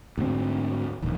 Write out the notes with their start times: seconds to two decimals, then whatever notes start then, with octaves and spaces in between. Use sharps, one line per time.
0.18 D2 G#2 G#3 C4
1.03 E1 A#1 D#2